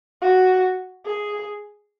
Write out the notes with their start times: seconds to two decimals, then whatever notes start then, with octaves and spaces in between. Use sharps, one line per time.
0.22 F#4
1.05 G#4